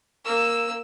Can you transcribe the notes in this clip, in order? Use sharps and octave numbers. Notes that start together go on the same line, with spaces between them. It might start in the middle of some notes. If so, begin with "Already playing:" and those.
A#3 E6